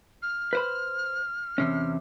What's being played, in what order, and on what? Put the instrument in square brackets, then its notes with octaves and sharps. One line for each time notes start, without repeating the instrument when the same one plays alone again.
[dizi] F6
[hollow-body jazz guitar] B4 C5 B5
E2 C3 C#4